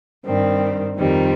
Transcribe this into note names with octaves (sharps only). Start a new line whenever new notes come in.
G2 D#3 G3 C4
F2 D#3 G3 C4 D#4